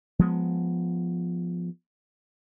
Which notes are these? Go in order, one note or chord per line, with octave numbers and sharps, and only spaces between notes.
F3 G#3 B3